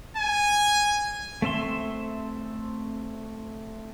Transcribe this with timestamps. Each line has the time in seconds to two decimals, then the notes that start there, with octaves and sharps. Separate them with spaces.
0.17 G#5
1.42 A3 C4 E5 C6